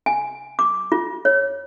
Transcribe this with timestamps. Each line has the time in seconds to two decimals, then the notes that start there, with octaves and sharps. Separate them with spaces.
0.06 G#5
0.59 D6
0.92 F4
1.25 C#5